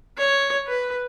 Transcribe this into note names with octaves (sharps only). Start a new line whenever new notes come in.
C#5
B4